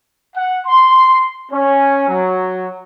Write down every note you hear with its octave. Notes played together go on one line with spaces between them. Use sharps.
F#5
C6
C#4
F#3